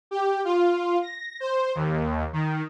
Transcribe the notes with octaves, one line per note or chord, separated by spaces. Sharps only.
G4
F4
A#6
C5
D#2
D#3